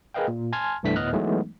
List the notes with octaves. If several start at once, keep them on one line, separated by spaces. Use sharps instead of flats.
G#4 A#4 B4 D#5 F5 G5
A#2
G#5 A5 C6 F6 G#6
C2 G2 E3 A3 D4 B6
D2 A2 B3 D#5 F6 F#6
E3 F#3 G#3 A3 B3 D#4